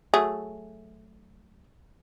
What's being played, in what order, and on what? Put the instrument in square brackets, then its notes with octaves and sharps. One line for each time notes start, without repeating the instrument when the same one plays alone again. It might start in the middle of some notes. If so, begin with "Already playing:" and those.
[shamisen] F#3 A3 G#4